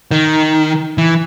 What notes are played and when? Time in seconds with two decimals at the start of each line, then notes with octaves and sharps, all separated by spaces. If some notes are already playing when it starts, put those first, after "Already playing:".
0.11 D#3
0.98 E3